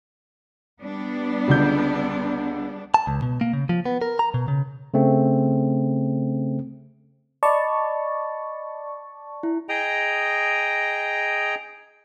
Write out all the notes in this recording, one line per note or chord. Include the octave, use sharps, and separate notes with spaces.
G3 B3 D4
C#2 D3 G6
A5
C#2
B2
A#3
C#3
F3
B3
A#4
A#5
B2
C#3
C#3 A3 C4
D5 D#5 A5 B5 C#6
E4
G#4 D#5 G5 A#5